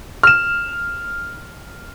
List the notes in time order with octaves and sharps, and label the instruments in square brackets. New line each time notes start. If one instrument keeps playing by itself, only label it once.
[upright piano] F6 E7